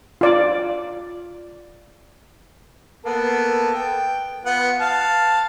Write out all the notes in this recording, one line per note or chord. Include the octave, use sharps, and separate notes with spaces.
F4 D5
A#3 B3 A4
G5
B3 F4 F#5
F5 A5